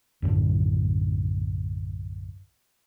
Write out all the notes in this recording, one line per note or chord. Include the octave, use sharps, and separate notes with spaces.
B1 F#2 A2 D3